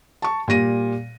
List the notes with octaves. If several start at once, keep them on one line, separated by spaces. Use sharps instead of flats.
A5 C#6
A#2 G3 A#6 D#7